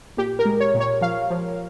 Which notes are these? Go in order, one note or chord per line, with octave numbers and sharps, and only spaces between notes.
A#2 G4
A#4
G#3
C#5
A#2
C#5
F3 F5
F3